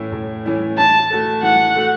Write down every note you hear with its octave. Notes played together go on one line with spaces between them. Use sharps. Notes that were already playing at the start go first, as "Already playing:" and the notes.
Already playing: A2 E3 A3 C#4 E4
A2
E3 A3 C#4 E4
E3 A5
A3 F#4 A4
E3 F#5
A3 F#4 A4